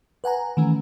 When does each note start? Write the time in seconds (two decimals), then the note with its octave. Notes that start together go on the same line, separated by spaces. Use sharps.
0.24 B4 F#5 G#5 A#5
0.57 D#3 E3 A3 C#4